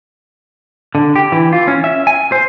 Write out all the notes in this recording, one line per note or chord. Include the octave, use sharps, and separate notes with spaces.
D3
G4
E3
F4
C#4
E5
G#5
C5